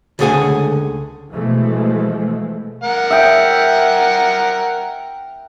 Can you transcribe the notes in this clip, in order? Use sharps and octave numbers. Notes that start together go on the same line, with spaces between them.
C#2 D3 A3 G#4 F#5 G#5
B2 E3 F3 G#3 A3
A#4 F#5
E5 G5